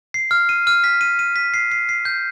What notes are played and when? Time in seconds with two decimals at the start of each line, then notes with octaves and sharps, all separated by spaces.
0.14 C7
0.31 F6
0.49 D#7
0.67 F6
0.84 B6
1.01 D#7
1.19 D#7
1.36 B6
1.54 C7
1.71 C7
1.89 C7
2.05 G6